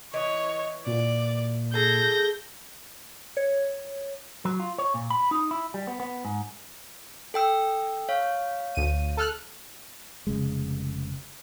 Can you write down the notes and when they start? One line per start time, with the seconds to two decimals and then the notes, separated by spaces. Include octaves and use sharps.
0.14 E3 C#5 D#5
0.86 A#2 D5
1.73 G#4 A4 G6 A#6
3.37 C#5
4.45 F#3
4.60 F4
4.78 C#5
4.94 A#2
5.10 B5
5.31 D#4
5.51 E4
5.74 G3
5.87 B3
6.00 B3
6.25 G#2
7.34 A4 G5 E6
8.09 C#5 F5
8.75 D2 D#7
9.17 A4 F6 F#6
10.27 F1 C#3 G#3